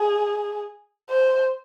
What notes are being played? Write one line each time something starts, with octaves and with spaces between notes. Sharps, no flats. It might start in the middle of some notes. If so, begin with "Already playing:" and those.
Already playing: G#4
C5